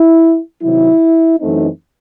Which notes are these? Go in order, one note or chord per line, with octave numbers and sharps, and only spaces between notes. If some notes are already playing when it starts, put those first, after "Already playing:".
Already playing: E4
C3 D#3 F#3 E4
F#2 E3 A3 C4 D#4